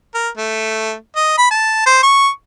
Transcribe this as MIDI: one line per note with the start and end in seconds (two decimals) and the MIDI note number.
0.14 0.29 70
0.37 0.93 57
1.16 1.36 75
1.38 1.50 83
1.51 1.84 81
1.86 2.00 72
2.03 2.29 85